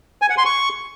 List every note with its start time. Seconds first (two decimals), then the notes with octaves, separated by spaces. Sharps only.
0.22 G#5
0.30 F#5
0.38 C6
0.46 C#6